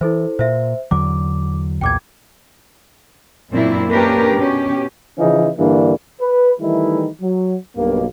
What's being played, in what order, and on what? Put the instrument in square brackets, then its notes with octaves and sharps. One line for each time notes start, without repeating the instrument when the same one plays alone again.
[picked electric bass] E3 [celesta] E4 A4 C5
[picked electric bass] A#2 [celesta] C5 E5
[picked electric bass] E2 D3 F#3 [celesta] D6
[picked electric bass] B1 E2 A#2 [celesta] G5 D6 G#6
[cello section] F#2 A#2 A#3 C4 D4 E4
A#3 C#4 D4 G4 A#4 B4
B2 C#4 G4
[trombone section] C#3 E3 F3 C#4 D#4
G2 D3 E3 A#3 D4
B4
D#3 E3 G3 A3 D#4 E4
F#3
B1 G2 B2 A#3